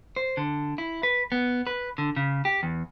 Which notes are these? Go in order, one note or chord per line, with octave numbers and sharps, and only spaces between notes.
C5
D3
E4
B4
B3
B4
D3
C#3
G4
E2